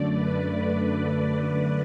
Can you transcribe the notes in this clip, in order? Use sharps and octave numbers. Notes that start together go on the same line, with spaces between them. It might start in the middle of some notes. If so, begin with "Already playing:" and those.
Already playing: F#2 D3 A3 D5
B4
B4